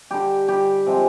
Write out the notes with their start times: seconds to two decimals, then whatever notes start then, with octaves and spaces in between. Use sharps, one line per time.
0.11 D3 G3 G4
0.48 D3 G3 G4
0.87 C3 F3 G#3